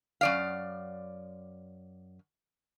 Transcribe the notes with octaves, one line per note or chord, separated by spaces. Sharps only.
F#2 D5 F5